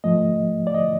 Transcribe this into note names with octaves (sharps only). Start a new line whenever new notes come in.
G#2 F3 A3 D#5
D5
D#5